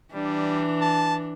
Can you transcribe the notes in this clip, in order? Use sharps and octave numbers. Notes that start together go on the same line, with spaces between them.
E3 G3 D4
A5